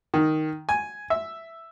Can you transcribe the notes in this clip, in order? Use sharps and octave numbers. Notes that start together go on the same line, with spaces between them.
D#3
G#5
E5